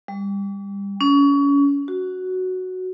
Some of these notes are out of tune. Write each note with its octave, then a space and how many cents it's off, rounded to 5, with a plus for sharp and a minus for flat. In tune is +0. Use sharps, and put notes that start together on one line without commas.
G3 +25
C#4 +30
F#4 +0